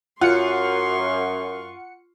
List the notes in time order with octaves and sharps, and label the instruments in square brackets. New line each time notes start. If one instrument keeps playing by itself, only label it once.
[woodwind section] F#2 [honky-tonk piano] F4 [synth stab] F#5 C#7 [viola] C6 C#6